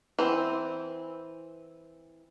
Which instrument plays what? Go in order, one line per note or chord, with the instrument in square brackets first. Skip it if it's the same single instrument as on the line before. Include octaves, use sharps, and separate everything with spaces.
[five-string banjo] E3 C4